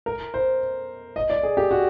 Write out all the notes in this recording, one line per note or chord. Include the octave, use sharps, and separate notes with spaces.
A#4
C5
D#5
D5
G#4
G4
F#4